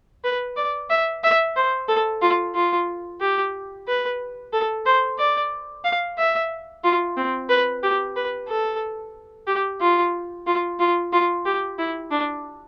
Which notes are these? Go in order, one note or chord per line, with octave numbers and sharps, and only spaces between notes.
B4
D5
E5
E5
C5
A4
F4
F4
G4
B4
A4
C5
D5
F5
E5
F4
C4
B4
G4
B4
A4
G4
F4
F4
F4
F4
G4
E4
D4